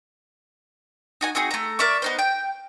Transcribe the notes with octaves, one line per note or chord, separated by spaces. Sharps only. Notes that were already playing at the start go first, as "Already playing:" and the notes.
D#4 F#4 G#5
C4 D#4 F#4 G#4
A3 A#5
A#4 D5 E5 C#6
B3 D#4 C5
G5